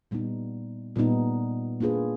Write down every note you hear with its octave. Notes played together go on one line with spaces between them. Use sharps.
A#2 G3 B3 D#4
A#2 G3 B3 D#4
A#3 D4 F4 G#4 B4